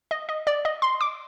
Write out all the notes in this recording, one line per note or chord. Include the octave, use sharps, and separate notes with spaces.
D#5
D#5
D5
D#5
C6
D6